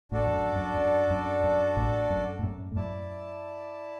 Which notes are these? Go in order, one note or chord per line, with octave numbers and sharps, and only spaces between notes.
A1 A2 D4 F#4 A4 D5
E2
F#2
F#2
F#2
F#2
F#2
A1 A2
F#2
A2
F#2
A2
F#2 E4 D5 A5